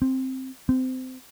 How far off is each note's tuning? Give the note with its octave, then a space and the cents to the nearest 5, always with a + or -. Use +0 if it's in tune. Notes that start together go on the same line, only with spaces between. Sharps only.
C4 +5
C4 -25